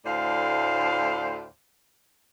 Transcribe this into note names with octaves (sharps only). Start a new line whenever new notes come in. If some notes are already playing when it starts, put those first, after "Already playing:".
D2 A2 C5 D5 F5